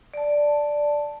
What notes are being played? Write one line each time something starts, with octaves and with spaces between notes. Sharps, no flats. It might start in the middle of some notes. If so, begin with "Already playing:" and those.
D5 A5